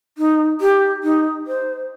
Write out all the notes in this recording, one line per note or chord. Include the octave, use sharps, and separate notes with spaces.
D#4
G4
D#4
C5